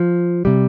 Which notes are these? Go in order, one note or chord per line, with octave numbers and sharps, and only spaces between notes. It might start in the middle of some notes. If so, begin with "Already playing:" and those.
Already playing: F3
C3 G3